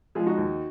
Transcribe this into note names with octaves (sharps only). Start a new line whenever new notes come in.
F3 G#3 F4 G#4
D#4 F#4
D#2